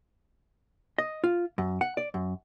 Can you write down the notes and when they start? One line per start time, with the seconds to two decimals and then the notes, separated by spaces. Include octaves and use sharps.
0.98 D#5
1.24 F4
1.58 F#2
1.81 F#5
1.97 D5
2.14 F#2